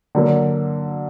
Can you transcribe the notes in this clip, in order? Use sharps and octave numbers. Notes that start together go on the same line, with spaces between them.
D3 F#3 A#3